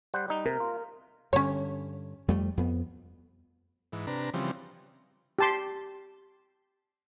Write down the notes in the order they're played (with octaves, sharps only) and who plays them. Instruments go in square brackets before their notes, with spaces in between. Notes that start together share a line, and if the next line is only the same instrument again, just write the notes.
[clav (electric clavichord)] G3 C5 F#5
G3 D#4
[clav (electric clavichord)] C3 [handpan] A#4
[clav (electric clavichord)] F4
[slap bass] G2 D3 [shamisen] C#4 C#5
[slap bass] F2 G3 A3
F2 B3
[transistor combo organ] G#2 E3
C3 D4 B4 A#5
C#3 E3 F3 G3 C4
[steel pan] G4 A5 C6